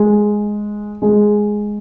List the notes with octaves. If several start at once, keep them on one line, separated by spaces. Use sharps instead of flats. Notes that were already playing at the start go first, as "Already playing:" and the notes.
Already playing: G#3
G#3